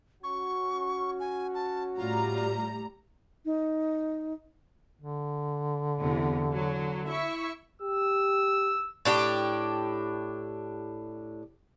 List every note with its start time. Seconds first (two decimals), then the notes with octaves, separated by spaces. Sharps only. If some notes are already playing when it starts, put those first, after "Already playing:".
0.24 C#4 F#4 C#6
1.20 G#5
1.55 A5
1.98 A2 G3 F4 A#5
3.45 D#4
5.01 D3
6.00 E2 C3
6.52 F#3
7.09 E4 E5 C#6
7.82 G4 E6
9.05 A2 D4 G4